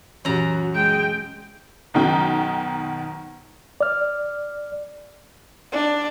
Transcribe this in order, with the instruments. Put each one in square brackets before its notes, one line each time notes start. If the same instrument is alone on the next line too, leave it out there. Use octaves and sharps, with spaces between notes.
[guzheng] F#2 A#5 [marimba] A#2 E3 [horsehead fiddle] F#4
[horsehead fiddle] G#3 G5
[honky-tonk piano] B1 F#2 B2 D#3 G5
[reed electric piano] D5 F6
[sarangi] D4